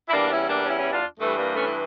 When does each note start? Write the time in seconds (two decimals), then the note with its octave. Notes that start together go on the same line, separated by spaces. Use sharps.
0.08 E4
0.12 E2 E3 G3 A#3 D4
0.31 C#4 E4
0.48 A#3 D4
0.66 C#4 E4
0.79 C#4 E4
0.92 D4 F4
1.19 G2 E3 G3 A3
1.37 G3 A#3
1.55 A3 C#4
1.66 E4